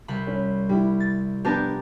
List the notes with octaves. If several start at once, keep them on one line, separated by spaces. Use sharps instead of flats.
C2 B5
C#4
G3 E4
A6
F3 B3 D4 G4 A#4 A5